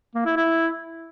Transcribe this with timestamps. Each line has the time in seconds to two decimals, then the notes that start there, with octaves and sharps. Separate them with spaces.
0.15 A#3
0.26 E4
0.36 E4